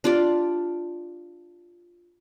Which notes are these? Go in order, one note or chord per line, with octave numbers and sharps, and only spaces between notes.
D4 F4 G4 D5